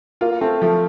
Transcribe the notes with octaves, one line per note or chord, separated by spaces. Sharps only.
A#3 F4
A#3
A3 C4
F3 A3